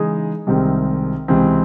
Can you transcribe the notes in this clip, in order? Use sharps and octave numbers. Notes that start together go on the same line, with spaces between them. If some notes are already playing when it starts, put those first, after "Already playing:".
Already playing: C#3 E3 G#3 D#4 G#4
C2 C3 D#3 G#3 C4
C#2 C3 E3 C4